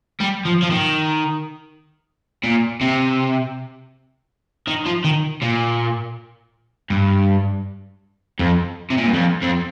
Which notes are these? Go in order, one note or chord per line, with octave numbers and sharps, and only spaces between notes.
G3
F3
F3
D#3
A#2
C3
D#3
F3
D#3
A#2
G2
F2
C3
A#2
G2
F2
F2